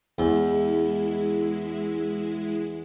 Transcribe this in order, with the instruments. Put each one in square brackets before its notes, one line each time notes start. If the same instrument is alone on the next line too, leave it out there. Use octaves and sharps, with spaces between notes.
[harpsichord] E2 [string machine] G#3 E4